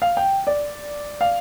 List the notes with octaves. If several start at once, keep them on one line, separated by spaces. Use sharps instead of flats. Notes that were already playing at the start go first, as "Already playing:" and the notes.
F5
G5
D5
F5